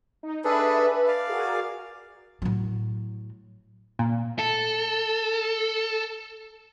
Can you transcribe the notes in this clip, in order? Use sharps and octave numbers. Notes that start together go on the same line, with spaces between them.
D#4
D4 G#4 A4 B4 E5
D5 F5
F#4 G#4 A#4
A2 F#3
A#2
A4